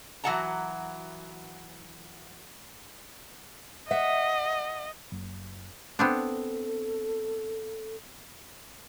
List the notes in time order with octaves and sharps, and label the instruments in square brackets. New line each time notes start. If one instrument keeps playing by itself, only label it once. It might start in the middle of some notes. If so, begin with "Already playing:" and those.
[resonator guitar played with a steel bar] E3 F#3 F#4 F#5 A5 A#5
[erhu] D#5 [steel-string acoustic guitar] E5 F#5
[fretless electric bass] F#1
[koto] B3 C4 D4 [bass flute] A4